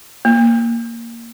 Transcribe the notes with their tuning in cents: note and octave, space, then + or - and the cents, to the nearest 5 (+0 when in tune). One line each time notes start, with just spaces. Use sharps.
A#3 -5